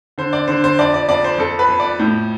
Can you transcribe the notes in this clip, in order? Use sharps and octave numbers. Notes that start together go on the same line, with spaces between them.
D3 C5
D5
D3 C5
C5
F2 D5
D5
F2 D5
C5
F2 A4
B4
F2
D5
A2